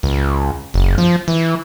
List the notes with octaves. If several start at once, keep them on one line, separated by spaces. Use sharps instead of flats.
C#2
F#1
F3
E3